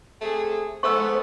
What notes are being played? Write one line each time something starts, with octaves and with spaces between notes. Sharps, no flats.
C3 A3 G#4
G#2 A3 B3 C5 C#6 E6